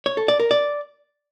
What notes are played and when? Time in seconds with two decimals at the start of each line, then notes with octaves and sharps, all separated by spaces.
0.06 C#5
0.17 A4
0.28 D5
0.40 A#4
0.51 D5